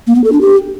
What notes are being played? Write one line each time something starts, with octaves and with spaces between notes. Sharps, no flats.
A#3
B3
A4
D4
G4